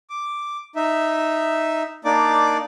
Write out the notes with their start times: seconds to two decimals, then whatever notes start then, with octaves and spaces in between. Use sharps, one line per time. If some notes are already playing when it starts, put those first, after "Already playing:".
0.10 D6
0.76 D#4 E5
2.05 A#3 D4 D#4 D5 D6